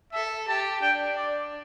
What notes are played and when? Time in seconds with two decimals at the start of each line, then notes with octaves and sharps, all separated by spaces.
0.13 A4 E5
0.47 G4 A5
0.82 D4 G5
1.17 D5